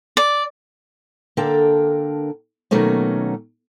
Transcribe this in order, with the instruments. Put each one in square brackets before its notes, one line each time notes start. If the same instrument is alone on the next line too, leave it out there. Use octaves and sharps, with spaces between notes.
[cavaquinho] D5
[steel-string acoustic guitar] D3 A#3 D4 A4 A#4 G5
B2 D#3 F#3 A3 A#3 C#4